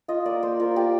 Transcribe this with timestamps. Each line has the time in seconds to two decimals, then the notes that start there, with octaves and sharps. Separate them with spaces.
0.08 F4 D#5
0.25 A#3 D5
0.43 A#3 C5
0.60 F4 A#4
0.76 A#3 G4